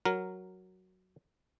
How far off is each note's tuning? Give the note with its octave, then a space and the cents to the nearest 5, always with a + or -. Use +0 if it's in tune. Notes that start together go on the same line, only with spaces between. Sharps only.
F#3 +0 A#4 +0